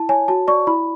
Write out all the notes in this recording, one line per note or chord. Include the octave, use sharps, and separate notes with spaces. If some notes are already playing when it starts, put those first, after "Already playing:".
Already playing: E4 A5
C#5 G#5
F#4 A5
D5 C#6
E4 B5